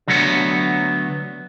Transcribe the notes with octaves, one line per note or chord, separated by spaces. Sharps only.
D3 F#3 A3 B3 C#5